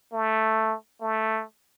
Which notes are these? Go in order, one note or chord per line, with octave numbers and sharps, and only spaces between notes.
A3
A3